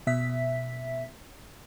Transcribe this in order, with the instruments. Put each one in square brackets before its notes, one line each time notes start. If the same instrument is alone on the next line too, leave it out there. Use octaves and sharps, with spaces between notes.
[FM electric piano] B2 E5 B6